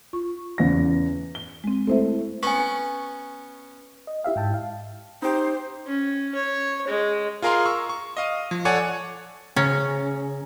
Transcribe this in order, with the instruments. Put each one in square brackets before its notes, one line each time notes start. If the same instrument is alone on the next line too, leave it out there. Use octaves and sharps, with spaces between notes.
[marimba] F4 C#6
[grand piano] E2 C#3 A#6
G7
[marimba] G#3 C4
[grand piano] A3 E4 [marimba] C4 C5 E5
[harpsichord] B3 C#4 [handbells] G#5 C#6
[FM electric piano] D#5
E4 G4 E5 F5
G#2 G5 A5
F5
[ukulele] D#4 G4 [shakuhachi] C5
[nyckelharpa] C#4
C#5
G#3
[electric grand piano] F4 G#4 A#4 F5 A#5 C6
C#6 E6
C#6
D#5 F5 D#7
F3
A4 C#5 D5 F#5 G#5
[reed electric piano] C#3 G#4 A#5 [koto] C#4